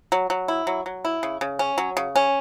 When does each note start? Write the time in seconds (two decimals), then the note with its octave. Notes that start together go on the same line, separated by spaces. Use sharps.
0.12 F#3
0.30 F#3
0.48 E4
0.67 F#3
0.86 F#3
1.05 E4
1.23 C#3
1.41 C#3
1.59 C#4
1.78 F#3
1.97 C#3
2.16 C#4